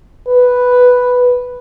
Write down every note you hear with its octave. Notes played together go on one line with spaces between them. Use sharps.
B4